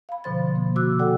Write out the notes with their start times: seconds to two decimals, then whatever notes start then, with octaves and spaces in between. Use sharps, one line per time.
0.09 F5 B5
0.24 B2 D3 F3 C5 C6 A6
0.55 A#3
0.75 C3 F#4 D6 E6 F#6
0.99 F#4 A4 D5 F#5 G5